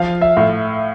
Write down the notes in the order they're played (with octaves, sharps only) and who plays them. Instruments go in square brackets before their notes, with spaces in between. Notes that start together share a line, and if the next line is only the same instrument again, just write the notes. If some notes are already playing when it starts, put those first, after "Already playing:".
Already playing: [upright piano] F3 [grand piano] F5
[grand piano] E5
[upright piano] A2